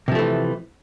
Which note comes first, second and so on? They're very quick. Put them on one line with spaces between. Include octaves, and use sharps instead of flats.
C3 F3 A3 E3